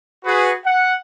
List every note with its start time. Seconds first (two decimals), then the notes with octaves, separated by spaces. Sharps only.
0.25 F#4 G#4 B4
0.65 F#5